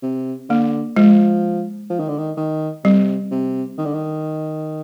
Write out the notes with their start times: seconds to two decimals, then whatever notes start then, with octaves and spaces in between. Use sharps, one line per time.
0.03 C3
0.49 D3 A#3
0.96 F3 G#3
1.90 F3
2.00 D#3
2.09 D3
2.18 D#3
2.37 D#3
2.84 C3 G3
3.31 C3
3.78 D#3
3.85 D3
3.93 D#3